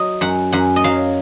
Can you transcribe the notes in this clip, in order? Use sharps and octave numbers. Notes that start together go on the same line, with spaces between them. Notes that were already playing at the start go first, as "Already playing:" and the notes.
Already playing: F#3 D#5
F#2 F#5
F#2 F#5
D#5
F#3 F5